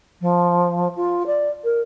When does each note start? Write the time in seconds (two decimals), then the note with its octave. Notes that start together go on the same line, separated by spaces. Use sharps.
0.21 F3
0.95 F4
1.26 D5
1.64 A#4